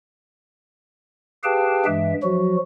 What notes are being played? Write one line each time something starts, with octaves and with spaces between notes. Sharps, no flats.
G4 G#4 B4 F5 G5 A5
G2 E3 G#3 E5
F3 F#3 F#4